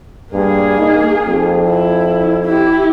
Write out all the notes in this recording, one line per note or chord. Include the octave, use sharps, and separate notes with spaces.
G2 A#3 G#4
D#4
F2
E4
E4 G4